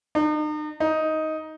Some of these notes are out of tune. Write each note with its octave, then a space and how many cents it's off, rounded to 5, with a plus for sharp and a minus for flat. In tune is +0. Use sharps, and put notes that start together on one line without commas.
D#4 -40
D#4 +10